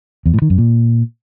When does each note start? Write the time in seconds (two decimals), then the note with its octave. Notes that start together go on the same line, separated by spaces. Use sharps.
0.26 E2
0.34 A2
0.42 D#3
0.50 F#2
0.58 A#2